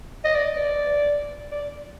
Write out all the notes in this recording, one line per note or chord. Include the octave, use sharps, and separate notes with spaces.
D#5
D5
D5
D5